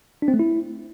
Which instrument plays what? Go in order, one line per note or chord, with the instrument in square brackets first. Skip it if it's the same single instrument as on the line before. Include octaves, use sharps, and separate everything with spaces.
[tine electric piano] D4
C4
A3
E4